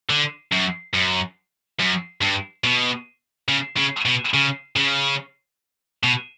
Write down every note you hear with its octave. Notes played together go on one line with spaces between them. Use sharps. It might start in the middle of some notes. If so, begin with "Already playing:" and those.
D3
F#2
F#2
F#2
G2
B2
C#3
C#3
B2
C#3
C#3
B2